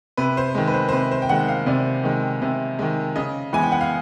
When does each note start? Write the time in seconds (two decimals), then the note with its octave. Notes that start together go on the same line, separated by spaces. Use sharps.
0.17 C3 B4
0.37 C5
0.55 D#3 G#3
0.68 B4
0.74 C5
0.89 C5
0.92 C3 B4
1.11 C5
1.22 G5
1.29 D#3 G#3 F#5
1.49 F5
1.66 C3 D5
2.04 D#3 G#3
2.42 C3
2.79 D#3 G#3
3.16 C#3 D#5
3.53 E3 G#3 B3 G#5
3.63 G5
3.72 F#5
3.81 F5